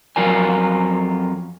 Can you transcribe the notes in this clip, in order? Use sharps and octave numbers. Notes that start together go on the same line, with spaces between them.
F2 F#3 F4 A#4 G#5